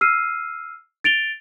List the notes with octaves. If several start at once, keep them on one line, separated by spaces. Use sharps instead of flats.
E6 F6 C7 D#7
A6 D7 F7 G7